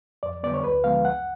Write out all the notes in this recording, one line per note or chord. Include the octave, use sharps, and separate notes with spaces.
F2 D5
D3 G3 B3 D5
C#5
D2 B4
D3 F3 G#3 B3 F5
C#2 F#5